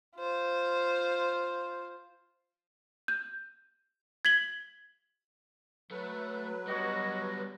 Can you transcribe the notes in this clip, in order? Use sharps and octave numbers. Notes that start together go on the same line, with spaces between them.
F4 C5
G6
G#6 B6 F#7 G7
F#3 A3 B4
G3 B3 F#4 C#5 D#5 A#6